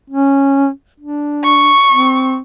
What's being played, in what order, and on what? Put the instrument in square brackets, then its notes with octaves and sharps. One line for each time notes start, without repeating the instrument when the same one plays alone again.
[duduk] C#4
D4
[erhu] C#6
[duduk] C4